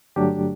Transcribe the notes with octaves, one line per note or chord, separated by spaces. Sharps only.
G2 D3 F#3 A3 D4 G4